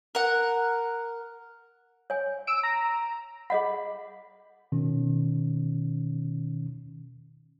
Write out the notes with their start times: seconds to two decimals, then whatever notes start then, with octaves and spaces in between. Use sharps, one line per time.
0.15 A#4 F#5
2.10 C#5 G#5
2.47 E6 D7
2.63 A#5
3.50 G#4 D#5 F#5 B5
4.72 B2 D#3 C#4